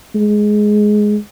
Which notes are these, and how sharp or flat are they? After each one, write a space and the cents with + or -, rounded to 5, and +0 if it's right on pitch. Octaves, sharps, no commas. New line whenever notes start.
G#3 +10